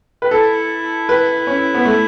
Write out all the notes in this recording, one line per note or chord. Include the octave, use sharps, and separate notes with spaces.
B4
E4 A4
B4
C#4
B3
A3